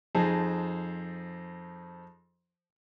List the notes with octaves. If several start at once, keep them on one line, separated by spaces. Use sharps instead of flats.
F2 D#4 G#4 C5 A5